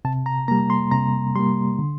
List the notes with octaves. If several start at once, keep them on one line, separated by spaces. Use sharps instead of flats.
C3 A5
A#5
G3 A#3 A#5
C6
C3 A#5
G3 A#3 C6
D3